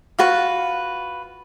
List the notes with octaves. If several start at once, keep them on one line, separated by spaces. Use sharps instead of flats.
F4 F#4 B4